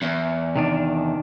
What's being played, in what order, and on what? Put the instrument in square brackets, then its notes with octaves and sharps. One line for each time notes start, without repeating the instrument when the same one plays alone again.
[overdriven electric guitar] E2
[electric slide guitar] C3 D#3 D4